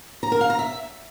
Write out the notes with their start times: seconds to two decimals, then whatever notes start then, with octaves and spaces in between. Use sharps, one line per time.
0.23 A#5
0.32 A#4
0.41 F5
0.50 A#5
0.59 E5